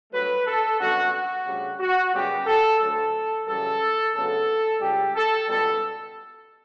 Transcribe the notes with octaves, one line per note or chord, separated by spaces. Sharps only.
G2 F#3 A3 B4
A4
F#2 D3 G3 B3 F#4
F#4
D2 C#3 G3
F#4
F#2 C#3 G3 B3 G4
A4
D2 D3 F#3 A3 A4
F#2 C#3 E3 G3 A4
D2 C#3 F#3 B3 A4
C#2 C#3 G3 G4
A4
C#2 B2 G3 B3 A4